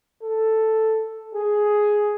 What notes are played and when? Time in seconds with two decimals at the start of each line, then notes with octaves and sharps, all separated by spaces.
0.23 A4
1.35 G#4